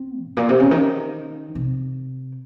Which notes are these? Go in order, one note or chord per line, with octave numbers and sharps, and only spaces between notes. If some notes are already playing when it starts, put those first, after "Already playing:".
Already playing: C4
G#2
A#2
C3
C#3
D#3
C3